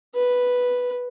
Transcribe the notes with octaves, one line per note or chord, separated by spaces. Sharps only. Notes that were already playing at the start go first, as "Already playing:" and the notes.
B4